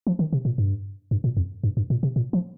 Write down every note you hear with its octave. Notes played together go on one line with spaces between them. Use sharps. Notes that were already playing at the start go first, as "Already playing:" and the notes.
F3
D#3
C3
A#2
G2
G2
A#2
F2
G2
G2
A#2
C3
A#2
F3